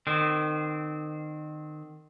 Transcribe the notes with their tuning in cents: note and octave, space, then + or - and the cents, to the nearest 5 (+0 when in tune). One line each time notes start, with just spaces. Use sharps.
D#3 -30 C4 -20